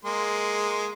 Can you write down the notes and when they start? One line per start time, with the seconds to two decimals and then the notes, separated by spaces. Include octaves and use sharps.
0.05 G#3 A#3 C6